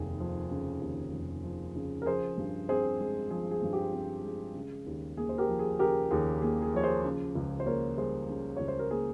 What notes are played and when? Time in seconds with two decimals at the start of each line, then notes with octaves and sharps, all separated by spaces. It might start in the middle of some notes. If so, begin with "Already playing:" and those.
Already playing: F1 D#2 G#4
0.20 F3
0.51 C#3
0.81 D#2
1.13 F1
1.44 F3
1.76 C#3
2.02 A#4
2.06 F3 G#4 C5
2.37 G2
2.69 C4 G#4 C5
3.00 G#3
3.30 F3 G#4
3.51 G#4
3.62 G2
3.73 G4
3.93 C4
4.24 G#3
4.55 C#3
4.86 D#2
5.17 A#3 G#4
5.29 C5
5.38 G4 A#4
5.48 F3
5.59 G#4
5.79 C#3 G4 A#4
6.11 D#2 G#4
6.42 A#3 G#4
6.62 G#4
6.74 F3 C#5
6.83 G#4 C5
7.05 C#3
7.35 C#2
7.60 C5
7.66 A#3 A#4 C#5
7.97 G3 G#4 C5
8.29 C#3
8.57 C#2 C#5
8.68 C5
8.79 A#4
8.91 A#3 G#4